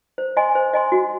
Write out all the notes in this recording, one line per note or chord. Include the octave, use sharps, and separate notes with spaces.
C5
D#5 G#5 C6
C5
D#5 G#5 C6
F#4